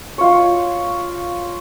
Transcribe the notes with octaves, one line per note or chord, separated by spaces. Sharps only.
F4 C#5